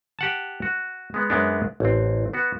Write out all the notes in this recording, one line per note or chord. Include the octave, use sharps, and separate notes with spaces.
G4 F#5 A5
F#4
G#3 B3
F#2 G#3 B3 D4
A1 C4
B3 F#4